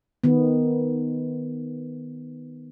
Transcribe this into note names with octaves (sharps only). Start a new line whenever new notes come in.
D#3 B3